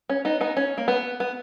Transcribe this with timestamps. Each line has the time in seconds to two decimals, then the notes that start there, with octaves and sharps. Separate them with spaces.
0.10 C#4
0.25 B3 D#4
0.41 B3 D#4
0.57 C#4
0.78 A#3
0.88 B3
1.20 B3